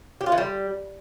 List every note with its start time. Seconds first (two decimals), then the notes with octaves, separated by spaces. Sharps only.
0.21 G4
0.26 F4
0.32 E3
0.38 G3